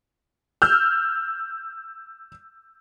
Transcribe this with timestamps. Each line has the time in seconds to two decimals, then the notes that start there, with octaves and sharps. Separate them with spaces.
0.62 E6 F6 G6